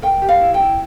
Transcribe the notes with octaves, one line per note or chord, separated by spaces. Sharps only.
A#4 G5
G4
F5
E4
G5
E4